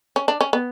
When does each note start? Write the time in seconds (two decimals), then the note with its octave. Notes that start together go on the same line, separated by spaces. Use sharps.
0.16 C#4
0.28 D4
0.41 C#4
0.53 B3